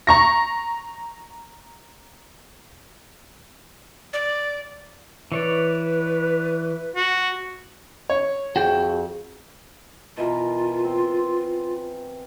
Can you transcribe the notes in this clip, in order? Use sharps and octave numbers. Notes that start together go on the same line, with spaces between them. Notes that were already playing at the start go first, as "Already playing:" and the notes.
A#5 C#6 A#6
D5
E3 B4 C#5 D5
F#4
C#5
F2 F#4 G#4 G5
B2 E3 F4 A#4
C4